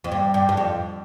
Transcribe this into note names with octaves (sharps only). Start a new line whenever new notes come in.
F2
G2
G2
G2
F2